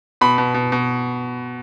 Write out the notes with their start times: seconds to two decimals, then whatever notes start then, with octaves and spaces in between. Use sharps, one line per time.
0.21 B2 B5
0.38 B2
0.54 B2
0.72 B2